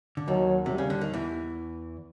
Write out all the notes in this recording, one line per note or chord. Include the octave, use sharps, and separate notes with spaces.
D3
D#2 D#3 F#3
C3 G3
C#3
D3
D#3
E2 E3